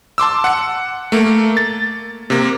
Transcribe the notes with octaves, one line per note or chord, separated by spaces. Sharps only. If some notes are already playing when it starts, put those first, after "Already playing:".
A5 C6 D6 E6
F#5 C#7
A3 A#3
A6
C3 A#3